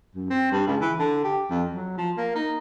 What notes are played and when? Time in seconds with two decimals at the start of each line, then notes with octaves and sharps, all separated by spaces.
0.15 F#2
0.30 C4
0.51 G2
0.67 C#2
0.81 E3
0.99 D3
1.24 G4
1.50 F2
1.72 F#3
1.97 F3
2.17 A#3
2.35 D#4